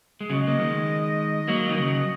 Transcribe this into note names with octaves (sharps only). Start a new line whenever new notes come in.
G#3
C#3 F#3 D#5
A#3
D#3 G#3
F#3 A#3
D#3
C#3 F#3